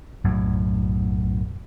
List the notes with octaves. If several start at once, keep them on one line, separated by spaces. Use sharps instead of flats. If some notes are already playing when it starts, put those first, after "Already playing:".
B1 F#2 A2